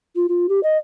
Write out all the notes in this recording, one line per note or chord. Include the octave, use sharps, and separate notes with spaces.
F4
F4
G4
D#5